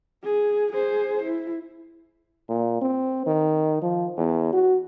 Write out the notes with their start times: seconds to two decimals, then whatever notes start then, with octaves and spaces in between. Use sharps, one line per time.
0.24 G#4
0.73 G#4 C5
1.23 E4
2.49 A#2
2.82 C4
3.27 D#3
3.82 F3
4.17 E2
4.53 F#4